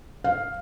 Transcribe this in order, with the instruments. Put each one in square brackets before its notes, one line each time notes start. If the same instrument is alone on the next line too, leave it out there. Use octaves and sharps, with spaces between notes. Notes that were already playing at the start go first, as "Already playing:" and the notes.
[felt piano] F5